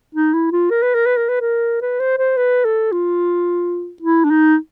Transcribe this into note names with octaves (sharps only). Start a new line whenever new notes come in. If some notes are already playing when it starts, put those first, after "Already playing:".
D#4
E4
F4
A#4
B4
A#4
B4
A#4
B4
A#4
B4
C5
C5
B4
A4
F4
E4
D4
D#4